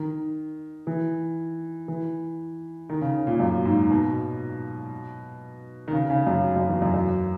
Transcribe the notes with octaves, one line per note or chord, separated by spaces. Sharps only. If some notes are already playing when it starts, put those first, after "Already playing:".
Already playing: D#3
E3
E3
D#3
C#3
A#2
F#2
G#2
B2
D#3
C#3
C#3
F#2
F#2
E2
F#2
F#2